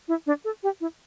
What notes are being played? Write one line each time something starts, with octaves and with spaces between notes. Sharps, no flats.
E4
D4
A4
G4
E4